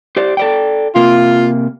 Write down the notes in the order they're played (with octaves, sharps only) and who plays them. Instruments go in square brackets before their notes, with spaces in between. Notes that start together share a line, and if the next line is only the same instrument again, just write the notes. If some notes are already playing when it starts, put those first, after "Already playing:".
[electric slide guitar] G4 C5 D5
A4 D5 G5
[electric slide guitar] C3 A#3 [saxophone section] F4